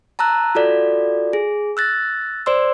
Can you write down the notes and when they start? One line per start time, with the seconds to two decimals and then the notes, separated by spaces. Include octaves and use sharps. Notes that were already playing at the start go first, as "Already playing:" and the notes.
0.19 A5 A#5 E6 F#6
0.55 F4 F#4 A4 D5
1.33 G#4
1.77 E6 F#6 A6 A#6
2.46 C5 D5 C6 E6